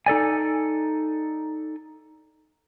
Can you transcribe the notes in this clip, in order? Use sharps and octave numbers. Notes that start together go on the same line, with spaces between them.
D#4 A4 D5 G#5